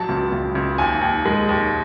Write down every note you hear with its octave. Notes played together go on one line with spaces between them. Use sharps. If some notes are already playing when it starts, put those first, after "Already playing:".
Already playing: A1 F#3 A5
C#2
C#2
C#2
D#2 G#5
D#2
G#3
D#2